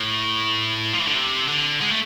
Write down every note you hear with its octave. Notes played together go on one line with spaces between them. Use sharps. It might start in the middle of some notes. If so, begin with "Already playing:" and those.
Already playing: A2
F3
E3
D3
C3
D3
G#3
A3